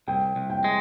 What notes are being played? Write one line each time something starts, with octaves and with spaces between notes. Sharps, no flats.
C2 G5
C2
G5
G#3